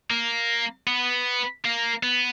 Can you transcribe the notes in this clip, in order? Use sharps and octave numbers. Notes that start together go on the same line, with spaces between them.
A#3
B3
A#3
B3